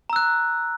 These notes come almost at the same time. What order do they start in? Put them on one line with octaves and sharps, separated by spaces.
A#5 E6 F#6